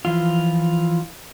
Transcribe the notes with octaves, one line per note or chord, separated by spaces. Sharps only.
E3 F3 F4